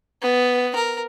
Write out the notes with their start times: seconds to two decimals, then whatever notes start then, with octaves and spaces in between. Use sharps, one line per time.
0.22 B3
0.75 A#4